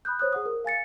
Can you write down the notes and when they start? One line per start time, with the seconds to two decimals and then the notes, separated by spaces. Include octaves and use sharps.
0.05 B5 D#6 F#6 G6
0.19 C5 C#5 D#6 F#6
0.33 G#4 F#5 D#6
0.46 A#4
0.65 F5 G#5 A6 C#7